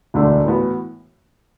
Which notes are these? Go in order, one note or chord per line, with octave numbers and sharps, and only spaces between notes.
E1 D2 D3 A3 D4
A2 E3 B3 F#4